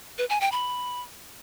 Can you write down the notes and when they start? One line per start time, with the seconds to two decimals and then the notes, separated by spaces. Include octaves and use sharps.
0.18 B4
0.29 G#5
0.41 G5
0.52 B5